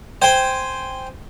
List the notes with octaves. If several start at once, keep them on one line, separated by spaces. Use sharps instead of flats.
C5 G5 G#5